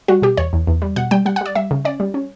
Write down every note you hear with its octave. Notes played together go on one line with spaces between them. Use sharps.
G3 F#4
B2 G4
E2 C#5
E2
E2
G3
B2 F#5
G3 G5
G3 F#5
F#5
G3 D5
G3 E5
C#3
C#4 D5
G3
C#4